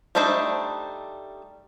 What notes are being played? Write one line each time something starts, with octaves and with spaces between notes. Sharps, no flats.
G3 A3 D4 D#4 C5